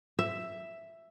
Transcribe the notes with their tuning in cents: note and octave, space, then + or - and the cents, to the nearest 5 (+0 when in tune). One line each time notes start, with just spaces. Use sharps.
E5 +5